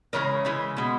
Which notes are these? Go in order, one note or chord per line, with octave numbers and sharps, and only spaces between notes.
C#3 E3 G#3 A#4 C#5
C#3 E3 G#3
B2 G#3